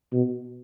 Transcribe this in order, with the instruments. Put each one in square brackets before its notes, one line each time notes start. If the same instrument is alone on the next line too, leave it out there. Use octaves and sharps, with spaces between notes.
[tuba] B2